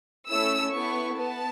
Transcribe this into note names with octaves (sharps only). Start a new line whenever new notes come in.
A3 C#4 E4 A4 E6
B3 E4 A4 C#6
B3 A5